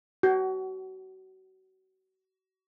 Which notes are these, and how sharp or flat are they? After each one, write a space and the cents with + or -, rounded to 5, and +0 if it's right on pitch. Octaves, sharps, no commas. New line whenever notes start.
F#4 +30